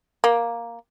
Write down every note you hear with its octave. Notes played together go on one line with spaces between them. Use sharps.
A#3